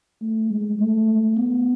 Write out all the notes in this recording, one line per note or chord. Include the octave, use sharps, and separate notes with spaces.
A3
G#3
A3
B3